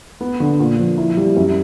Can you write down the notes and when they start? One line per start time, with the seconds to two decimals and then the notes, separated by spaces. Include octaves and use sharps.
0.21 B3
0.40 D3
0.59 A#2
0.79 F3
0.98 E4
1.17 G3
1.36 F#2